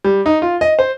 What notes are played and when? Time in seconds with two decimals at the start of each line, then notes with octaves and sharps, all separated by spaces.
0.04 G3
0.26 D#4
0.42 F4
0.61 D#5
0.79 C5